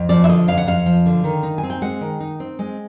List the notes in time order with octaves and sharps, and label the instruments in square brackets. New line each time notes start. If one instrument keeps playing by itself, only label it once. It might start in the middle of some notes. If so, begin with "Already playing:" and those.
Already playing: [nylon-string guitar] F2
F3 D5
E5
D3 D#5
F2 F5
F#5
F2 F5
F3
D3
D#3
D#4
G#5
C4
G5
G#3 F#5
D#3
D#4
C4
G#3